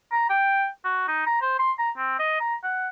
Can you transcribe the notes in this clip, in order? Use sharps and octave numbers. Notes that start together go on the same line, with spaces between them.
A#5
G5
F#4
D#4
A#5
C5
C6
A#5
C4
D#5
A#5
F#5